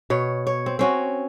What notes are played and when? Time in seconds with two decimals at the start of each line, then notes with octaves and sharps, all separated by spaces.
0.10 B2 C#5
0.47 C#5
0.66 C4
0.79 C4 C#4 F#4